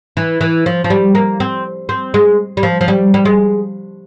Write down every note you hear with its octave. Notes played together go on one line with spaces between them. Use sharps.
E3
E3
F3
F3
G3
A#3
C4
C4
G#3
G3
F3
F3
G3
G3
G#3